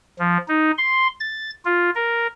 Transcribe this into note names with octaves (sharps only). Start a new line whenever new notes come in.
F3
D#4
C6
A6
F4
A#4